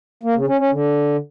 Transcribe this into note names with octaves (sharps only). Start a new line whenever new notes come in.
A#3
C#3
C#4
C#4
D3